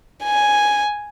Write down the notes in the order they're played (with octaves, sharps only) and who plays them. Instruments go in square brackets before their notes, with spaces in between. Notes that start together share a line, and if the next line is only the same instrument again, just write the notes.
[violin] G#5